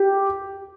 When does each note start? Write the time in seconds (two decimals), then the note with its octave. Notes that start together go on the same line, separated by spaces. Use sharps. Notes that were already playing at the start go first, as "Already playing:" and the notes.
Already playing: G4